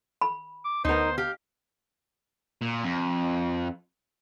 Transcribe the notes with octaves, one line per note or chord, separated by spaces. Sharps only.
B5
D6
D2 B3 D#4 A#4 C5
G4 F5
A#2
F2